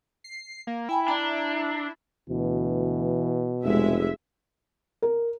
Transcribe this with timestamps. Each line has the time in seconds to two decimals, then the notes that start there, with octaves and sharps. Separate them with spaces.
0.24 C7
0.67 A#3
0.89 E4 G5 G#5 B5
1.08 D4 A#5
2.30 D2 B2 E3
3.64 F1 G#3 E5
5.02 A#4